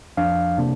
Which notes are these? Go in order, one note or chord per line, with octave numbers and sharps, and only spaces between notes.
F2 F3 D4 F5
C3 A#3 D4